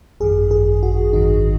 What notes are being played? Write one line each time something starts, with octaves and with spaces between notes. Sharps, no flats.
G#1 F#2 D#3 G#4
G#4
F#4
G#1 F#2 D#3 D#4